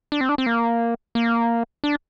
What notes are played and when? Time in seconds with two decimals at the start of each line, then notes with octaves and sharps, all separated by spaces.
0.12 D4
0.21 C4
0.29 D4
0.38 C4
0.46 A#3
1.15 A#3
1.84 D4